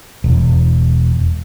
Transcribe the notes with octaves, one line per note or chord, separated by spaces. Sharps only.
E1